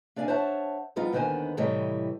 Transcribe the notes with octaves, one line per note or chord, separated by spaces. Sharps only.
A#3 D4 D5 E5 F5 G#5
C5 C#5 E5 F#5 A5
F3 G3 B3 D#4 F4
D#2 D3 D#3 B3 C5 G#5
A2 C3 E3 G3 C#5 D#5